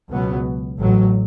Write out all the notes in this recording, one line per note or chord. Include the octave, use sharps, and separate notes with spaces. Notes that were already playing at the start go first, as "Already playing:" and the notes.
C#2 B2 F#3 B3
A1 A2 F#3